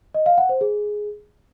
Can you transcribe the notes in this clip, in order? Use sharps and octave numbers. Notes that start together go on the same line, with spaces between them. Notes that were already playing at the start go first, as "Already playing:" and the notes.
D#5
F5
F#5
C5
G#4